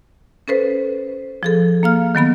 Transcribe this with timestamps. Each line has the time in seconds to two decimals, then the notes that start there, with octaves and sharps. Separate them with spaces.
0.48 C#4 A4 B4 C5
1.43 F3 G#4 A4
1.83 A#3 F5 F6
2.15 D#3 F#3 B3 B5